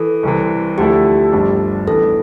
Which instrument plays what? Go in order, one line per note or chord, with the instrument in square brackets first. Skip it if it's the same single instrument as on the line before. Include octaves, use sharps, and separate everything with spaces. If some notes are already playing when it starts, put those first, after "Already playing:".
Already playing: [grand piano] E3 [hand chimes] A4
[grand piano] C2 C3 E3
[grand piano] D2 D3 F3 A3 E4 [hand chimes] G4
[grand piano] G1 G2 F3 A3 D4
[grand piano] A1 G2 E3 B3 D4 [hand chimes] A4